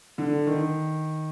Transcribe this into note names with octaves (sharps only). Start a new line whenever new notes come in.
D3
D#3